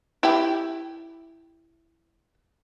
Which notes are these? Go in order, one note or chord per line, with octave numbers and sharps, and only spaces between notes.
E4 G4